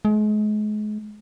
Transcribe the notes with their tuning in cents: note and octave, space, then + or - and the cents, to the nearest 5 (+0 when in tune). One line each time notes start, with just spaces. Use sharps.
G#3 +35